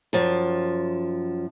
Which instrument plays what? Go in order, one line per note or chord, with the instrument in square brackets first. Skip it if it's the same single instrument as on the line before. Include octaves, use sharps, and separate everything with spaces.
[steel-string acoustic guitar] F#2 F3